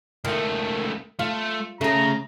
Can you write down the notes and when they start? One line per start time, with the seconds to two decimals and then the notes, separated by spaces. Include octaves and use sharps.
0.25 C#2 D#3 A3
1.19 A3 F4
1.81 C#3 A3 G#4 A#5